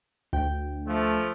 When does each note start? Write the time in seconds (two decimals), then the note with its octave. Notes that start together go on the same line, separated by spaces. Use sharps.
0.33 D2 G5
0.86 F3 A3